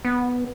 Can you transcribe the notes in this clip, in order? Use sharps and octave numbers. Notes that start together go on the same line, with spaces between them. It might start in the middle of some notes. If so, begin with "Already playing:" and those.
B3